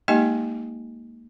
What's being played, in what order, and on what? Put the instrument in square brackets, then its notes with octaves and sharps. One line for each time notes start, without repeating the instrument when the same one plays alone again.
[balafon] G#3 A#3 D#4 G4 D#5 G#5